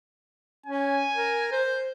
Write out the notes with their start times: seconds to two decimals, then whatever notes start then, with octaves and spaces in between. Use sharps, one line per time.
0.66 C#4 G#5
1.16 A#4
1.52 C5